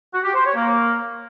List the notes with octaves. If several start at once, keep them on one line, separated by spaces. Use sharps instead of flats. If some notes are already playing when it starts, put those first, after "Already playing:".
F#4
G4
C5
C#5
A#3